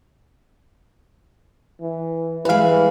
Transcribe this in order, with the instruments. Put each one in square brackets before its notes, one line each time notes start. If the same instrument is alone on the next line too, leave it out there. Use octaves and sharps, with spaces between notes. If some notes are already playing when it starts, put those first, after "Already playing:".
[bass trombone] E3
[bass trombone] E3 [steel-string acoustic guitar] G3 G#3 [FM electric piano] B4 F5